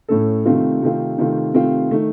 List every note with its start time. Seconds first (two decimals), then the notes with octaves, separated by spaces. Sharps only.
0.08 A2 A3 C#4 A4
0.45 C3 D#3 A3 C4 F4
0.82 C3 D#3 A3 C4 F4
1.18 C3 D#3 A3 C4 F4
1.54 C3 D#3 A3 C4 F4
1.91 D#3 A3